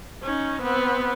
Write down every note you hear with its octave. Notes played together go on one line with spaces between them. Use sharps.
C#4 D#4
B3 C4